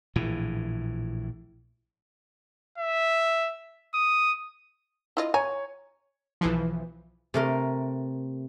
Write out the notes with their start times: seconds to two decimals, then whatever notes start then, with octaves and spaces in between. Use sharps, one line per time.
0.16 A#1 A2 E3
2.78 E5
3.94 D#6
5.17 E4 F4 D#5
5.34 C#5 G#5 A#5
6.41 B1 E3 F3
7.34 C3 A3 A#4